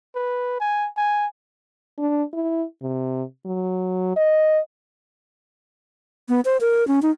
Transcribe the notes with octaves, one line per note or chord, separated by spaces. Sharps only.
B4
G#5
G#5
D4
E4
C3
F#3
D#5
B3
C5
A#4
C#4
D#4